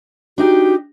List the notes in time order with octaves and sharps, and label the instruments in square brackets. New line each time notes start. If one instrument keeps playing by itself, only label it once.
[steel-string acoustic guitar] D4 D#4 G4 [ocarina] F#4